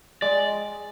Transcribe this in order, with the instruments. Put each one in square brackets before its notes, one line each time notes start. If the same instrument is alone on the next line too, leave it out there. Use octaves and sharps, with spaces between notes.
[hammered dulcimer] G#3 [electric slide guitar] D5